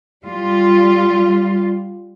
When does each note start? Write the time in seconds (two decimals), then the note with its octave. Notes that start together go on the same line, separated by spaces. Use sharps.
0.24 G3 F4